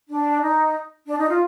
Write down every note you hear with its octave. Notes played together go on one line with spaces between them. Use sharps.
D4
D#4
D4
D#4
F4